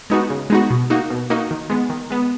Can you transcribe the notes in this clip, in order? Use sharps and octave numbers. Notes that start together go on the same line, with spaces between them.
G#3 B3 D#4 F#4
C#3
G#3 B3 D#4 F#4
B2
A#3 D#4 F#4
B2
A#3 D#4 F#4
D#3
G#3 B3
D#3
G#3 B3